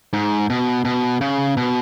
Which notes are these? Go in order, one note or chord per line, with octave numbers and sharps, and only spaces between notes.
G#2
B2
B2
C#3
B2